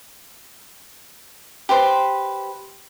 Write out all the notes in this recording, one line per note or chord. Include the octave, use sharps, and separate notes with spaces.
G4 B4 C5